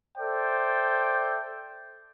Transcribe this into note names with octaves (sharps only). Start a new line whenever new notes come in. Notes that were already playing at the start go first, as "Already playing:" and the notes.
A4 C5 D5 E5 G5